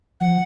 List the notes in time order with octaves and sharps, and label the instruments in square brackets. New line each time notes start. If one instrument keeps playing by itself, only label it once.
[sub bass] F3 [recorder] F#5